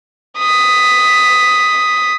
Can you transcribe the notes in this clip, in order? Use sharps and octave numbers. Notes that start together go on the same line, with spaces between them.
D#6 B6